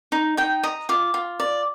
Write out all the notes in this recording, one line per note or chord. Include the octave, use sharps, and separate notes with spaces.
D#4
D#4 G5
D#5 A#5
F4 D6
F4
D5